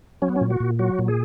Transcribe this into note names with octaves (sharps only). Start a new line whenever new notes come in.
F#3 C#4
B3
C#4
A#2
F#4
A#2
F#3 F#4
A#2
G#4